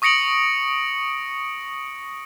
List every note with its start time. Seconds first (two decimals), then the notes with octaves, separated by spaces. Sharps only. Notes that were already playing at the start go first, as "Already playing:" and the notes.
0.02 C#6 D#6 A#6 C#7 D7 F#7